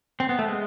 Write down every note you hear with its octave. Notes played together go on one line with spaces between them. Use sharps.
C4
B3
A3
G#3